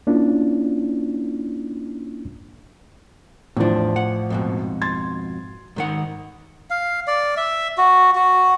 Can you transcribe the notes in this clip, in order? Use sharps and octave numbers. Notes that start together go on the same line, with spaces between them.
A#3 C#4 D4 E4 F4
A1 E2 F3 D4
F#5
F2 G#2 B2
C6 G#6 A6
G#2 D#3 F#5
F5
D5
E5
F#4
F#4